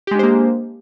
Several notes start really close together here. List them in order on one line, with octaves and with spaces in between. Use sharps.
G4 G#3 D4 C5 A#3